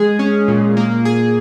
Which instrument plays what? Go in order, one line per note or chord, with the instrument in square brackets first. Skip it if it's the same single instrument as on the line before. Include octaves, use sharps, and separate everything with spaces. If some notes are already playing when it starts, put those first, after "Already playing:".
Already playing: [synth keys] G#3 G#4
C#4
A#2
A#3
G#4